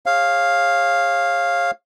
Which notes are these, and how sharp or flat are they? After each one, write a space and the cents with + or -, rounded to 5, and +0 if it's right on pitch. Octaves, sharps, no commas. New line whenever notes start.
G#4 -35 C#5 -30 F5 +0